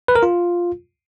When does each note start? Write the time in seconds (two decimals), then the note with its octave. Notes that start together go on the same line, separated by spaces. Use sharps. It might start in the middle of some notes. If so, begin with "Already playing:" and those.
0.08 B4
0.16 A#4
0.23 F4